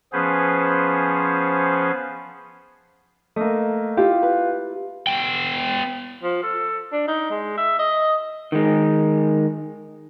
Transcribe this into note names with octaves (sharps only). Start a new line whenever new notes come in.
F3 B3 C#4 G#4 B4 C5
A3 A#3 D#5
E4 F4 G4
B4
B3 G5
F3
A4
D4
D#4
G#3
E5
D#5
D#3 G#3